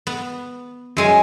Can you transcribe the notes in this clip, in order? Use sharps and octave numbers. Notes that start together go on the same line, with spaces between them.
B3
F#2 G#3 G#5